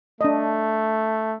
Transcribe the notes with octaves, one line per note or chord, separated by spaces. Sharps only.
A3 D4 D#5